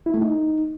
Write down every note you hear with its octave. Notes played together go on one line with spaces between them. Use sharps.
E4
A3
D#4